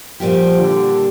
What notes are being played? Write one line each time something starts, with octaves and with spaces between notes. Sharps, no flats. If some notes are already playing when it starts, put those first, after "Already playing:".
A#2 F3 G3 A#3 G4
D3